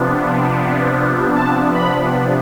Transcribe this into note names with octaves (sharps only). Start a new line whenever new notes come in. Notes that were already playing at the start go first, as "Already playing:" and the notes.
Already playing: C3 F3 B3 D4
A5
B5